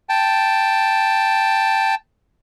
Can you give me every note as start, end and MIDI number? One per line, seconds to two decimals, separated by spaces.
0.09 1.95 79
0.09 1.95 81